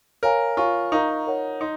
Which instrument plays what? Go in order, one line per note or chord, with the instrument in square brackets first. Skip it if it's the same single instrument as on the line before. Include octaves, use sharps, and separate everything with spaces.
[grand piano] A#4 [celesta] C#5 F5 G#5
[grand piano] F4 [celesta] C#5 G#5 C#6
[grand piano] D#4 [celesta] A#4 F5 A#5 C#6
[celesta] A#4 C#5 F#5
[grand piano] D#4 [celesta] C6